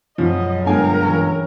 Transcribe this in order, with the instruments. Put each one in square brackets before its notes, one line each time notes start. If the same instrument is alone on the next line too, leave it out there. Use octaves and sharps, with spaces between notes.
[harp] F#2 B2 G#3 [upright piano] F3 [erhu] D#5
[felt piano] G1 G#3 G#5 [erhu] A#4 [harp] F5 G5
[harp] E3 C#4